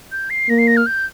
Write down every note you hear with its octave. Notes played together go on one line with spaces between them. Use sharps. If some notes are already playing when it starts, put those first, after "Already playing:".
G6
C7
A#3 A#6
C7
A#6
F6
G6